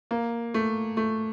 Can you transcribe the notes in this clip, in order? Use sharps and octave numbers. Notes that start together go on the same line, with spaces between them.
A#3
A3
A3